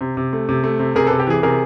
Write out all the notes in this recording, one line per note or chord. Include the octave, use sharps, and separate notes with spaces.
C3
C3
A3
C3
A3
C3
C3 G#4 A#4
C3 A4 B4
G4 A4
E3 G#4
C3 G#4 A#4